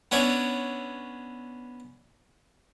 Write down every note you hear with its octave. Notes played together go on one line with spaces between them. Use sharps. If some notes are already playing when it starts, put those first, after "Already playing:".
B3 C#4 D4 C#5 E5